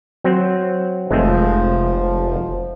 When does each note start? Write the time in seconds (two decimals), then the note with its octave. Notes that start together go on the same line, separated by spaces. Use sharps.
0.24 F#3 C4
1.11 F1 F3 G#3 A3 C4